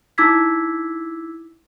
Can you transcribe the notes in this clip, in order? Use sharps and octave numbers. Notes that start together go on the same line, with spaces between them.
D#4 E4 D6 E6 G#6 B6